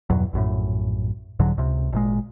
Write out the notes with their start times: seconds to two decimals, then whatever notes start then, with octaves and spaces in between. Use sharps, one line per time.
0.10 E2 G2 B2 F#3
0.33 A#1 F#2 A2
1.39 C2 G#2 D3 F#3
1.58 C#2 C3
1.92 G#1 A#2 G#3